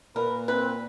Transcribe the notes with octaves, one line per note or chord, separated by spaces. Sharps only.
A#2 A#4 B4
C4 B4